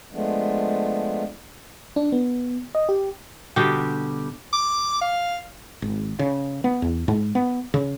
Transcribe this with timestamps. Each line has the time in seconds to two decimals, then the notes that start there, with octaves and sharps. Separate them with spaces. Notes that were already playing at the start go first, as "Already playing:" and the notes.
0.13 F3 G#3 A3 B3 D4
1.96 D4
2.12 B3
2.75 D#5
2.89 G4
3.56 B2 D3 G3 G4
4.53 D6
5.01 F5
5.82 G#1
6.19 C#3
6.64 B3
6.82 E2
7.08 G#2
7.35 B3
7.74 C#3